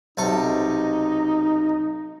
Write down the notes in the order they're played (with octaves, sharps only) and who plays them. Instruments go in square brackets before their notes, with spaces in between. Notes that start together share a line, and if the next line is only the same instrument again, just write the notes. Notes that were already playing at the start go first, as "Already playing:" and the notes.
[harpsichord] B1 C3 A4 [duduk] D#4